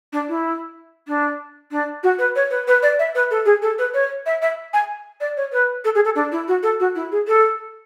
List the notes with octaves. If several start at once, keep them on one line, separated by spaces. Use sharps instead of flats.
D4
E4
D4
D4
F#4
B4
C#5
B4
B4
D5
E5
B4
A4
G#4
A4
B4
C#5
E5
E5
G#5
D5
C#5
B4
A4
G#4
A4
D4
E4
F#4
A4
F#4
E4
G#4
A4